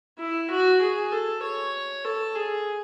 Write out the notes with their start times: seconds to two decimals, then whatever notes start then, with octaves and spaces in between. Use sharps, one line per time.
0.19 E4
0.50 F#4
0.81 G#4
1.12 A4
1.43 C#5
2.05 A4
2.35 G#4